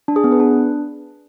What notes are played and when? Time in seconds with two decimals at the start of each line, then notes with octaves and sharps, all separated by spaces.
0.08 D4
0.16 G#4
0.24 B3
0.32 B4
0.40 D4